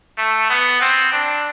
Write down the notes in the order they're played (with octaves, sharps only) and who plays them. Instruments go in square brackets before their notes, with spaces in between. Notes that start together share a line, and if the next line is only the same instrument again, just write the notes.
[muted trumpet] A3
B3
C4
D4